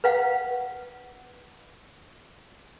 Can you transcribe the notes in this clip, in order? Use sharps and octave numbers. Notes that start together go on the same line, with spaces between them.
B4 F5 F#5